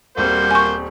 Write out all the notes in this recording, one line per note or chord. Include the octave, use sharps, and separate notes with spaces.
D#1 G3 A#3 C4 F#4 C5 G6
G#5 C#6